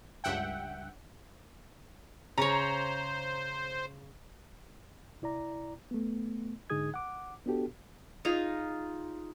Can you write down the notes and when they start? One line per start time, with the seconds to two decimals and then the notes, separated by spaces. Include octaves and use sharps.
0.24 C#2 G2 E5 F#5 G5
2.38 C#3 C5 C#5 A#5
5.22 C2 E4 D5 A#5
5.91 A3 B3
6.70 G#2 D3 D#4 G#4 D#6 G#6
6.94 F#5 D6
7.46 B3 D4 F#4 G4 A4
8.25 D#4 F4 G#4 A#5